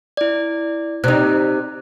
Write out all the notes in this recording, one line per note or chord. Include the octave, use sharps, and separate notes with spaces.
E4 D5
C3 D#4 F#6